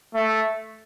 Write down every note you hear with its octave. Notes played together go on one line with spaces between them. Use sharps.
A3